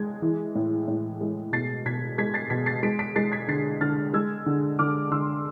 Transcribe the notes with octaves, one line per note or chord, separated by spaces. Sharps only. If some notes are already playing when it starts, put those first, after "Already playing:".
Already playing: G#3 G#6
E3
A2
A2
G#3
B2 A6 C7
B2 G#6 B6
G#3 G#6 B6
A6 C7
B2 G#6 B6
A6 C7
G#3 B6 D7
B6 D7
G#3 A6 C7
G#6 B6
D3 A6 C7
D3 F6 A6
G#3 E6 G#6
D3
D3 D6 F6
D3 C6 E6